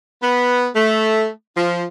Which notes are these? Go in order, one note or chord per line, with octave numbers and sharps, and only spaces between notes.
B3
A3
F3